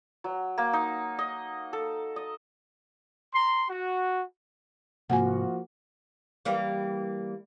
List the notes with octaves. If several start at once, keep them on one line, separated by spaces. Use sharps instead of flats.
F#3
A#3
D#4
D#5
A4
D#5
A#5 C6
F#4
G#2 C3 F3 A#3 F#4 F#5 G#5
E3 G3 A#3